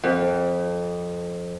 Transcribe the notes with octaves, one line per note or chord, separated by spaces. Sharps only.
F2